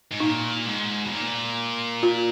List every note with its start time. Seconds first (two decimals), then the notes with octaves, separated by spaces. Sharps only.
0.12 G#2
0.20 A#2 D#4
0.66 G#2
1.05 B2
1.12 A#2
2.03 F4